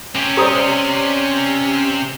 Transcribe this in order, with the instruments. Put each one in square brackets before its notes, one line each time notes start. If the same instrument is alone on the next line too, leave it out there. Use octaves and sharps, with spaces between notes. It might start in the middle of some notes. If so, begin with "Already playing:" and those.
[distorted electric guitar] C3 [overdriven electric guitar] C#4
[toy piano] G4 A#5 D#6 [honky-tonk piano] C5 D5